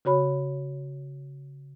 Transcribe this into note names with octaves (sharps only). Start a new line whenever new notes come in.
C#3 F#4 C#5 B5